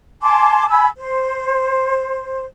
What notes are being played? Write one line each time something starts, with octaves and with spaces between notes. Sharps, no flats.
G#5 A5 C6 D6
G#5 B5 E6
C5